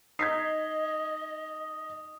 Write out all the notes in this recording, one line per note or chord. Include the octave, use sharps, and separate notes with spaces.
D#4 D#5 D#6 G#6 B6 C7